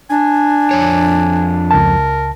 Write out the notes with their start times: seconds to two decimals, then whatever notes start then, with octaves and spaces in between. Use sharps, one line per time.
0.10 D4 G#5
0.71 F2 C#5
1.71 C#2 A#4 A5